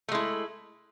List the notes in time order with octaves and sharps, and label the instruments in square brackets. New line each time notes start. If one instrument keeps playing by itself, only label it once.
[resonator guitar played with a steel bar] A3
G#3
E4